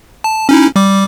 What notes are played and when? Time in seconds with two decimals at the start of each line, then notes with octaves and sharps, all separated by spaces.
0.24 A5
0.49 C#4 D#4 E4
0.76 G3 D6